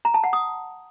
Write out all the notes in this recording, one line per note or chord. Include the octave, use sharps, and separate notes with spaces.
A#5
A5
F#5
D#6